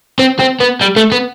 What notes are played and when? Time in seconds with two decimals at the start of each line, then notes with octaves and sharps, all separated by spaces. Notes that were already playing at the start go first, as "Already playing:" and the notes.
0.19 C4
0.39 C4
0.61 B3
0.81 G3
0.96 A3
1.12 B3